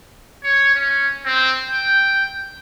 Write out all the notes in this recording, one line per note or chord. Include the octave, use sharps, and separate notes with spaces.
C#5
C#4
C4
G5